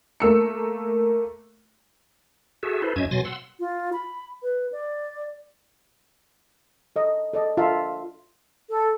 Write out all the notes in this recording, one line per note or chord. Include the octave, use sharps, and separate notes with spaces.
A3 A#3 E6 C#7
F#4 G#4 A4 E5
E4 A4 B4 C5
F#2 C#4 D#5 E5 G#6
B2 F#3 G#5 C6 A6 A#6
F#5 C6 E6
F4
B5
B4
D5
A4 D#5
A4 D5 D#5
D4 F4 A4 E5 F5 A5
A4